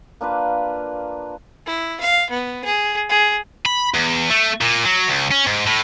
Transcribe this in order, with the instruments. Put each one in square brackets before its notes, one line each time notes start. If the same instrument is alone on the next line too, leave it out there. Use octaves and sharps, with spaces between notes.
[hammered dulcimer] A#3 D4 F4 B4
[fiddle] E4
F5
B3
G#4
G#4
[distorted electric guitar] B5
E2
A3
A#2
F#3
C#2
C#4
G#2
A2